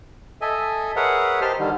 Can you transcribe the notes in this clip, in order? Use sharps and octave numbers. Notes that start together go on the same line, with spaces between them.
A4 D#5 E5 G#5
G#4 A#4 B4 C#5 E5 F#5
G4 A#4 C5 D#5 A5 F6
D3 D#3 G3